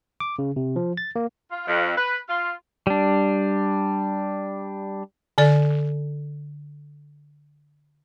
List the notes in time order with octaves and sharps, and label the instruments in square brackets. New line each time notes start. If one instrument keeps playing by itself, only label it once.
[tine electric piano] D6
C#3
C3
F3
A6
A#3
[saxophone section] F4
F2
B4
F4
[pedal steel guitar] G3 D4
[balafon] D3 A4 D5